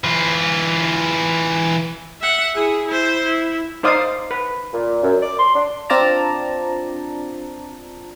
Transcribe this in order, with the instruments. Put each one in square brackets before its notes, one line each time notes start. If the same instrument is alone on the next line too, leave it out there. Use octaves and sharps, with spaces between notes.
[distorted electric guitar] E3 F4
[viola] E5 F#5
E4 G#4
E4 C5
E4
[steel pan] D#4 C5 D5 F5 D#6
B4
[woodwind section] A#2
F#2
D5
C6
D4
[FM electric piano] C4 D4 F4 D5 A5 A#5